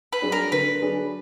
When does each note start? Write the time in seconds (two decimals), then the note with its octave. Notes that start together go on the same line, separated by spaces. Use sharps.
0.13 B4
0.22 F#3 D4 G#4
0.32 A#4
0.52 D3 B4
0.81 F#3 D4 G#4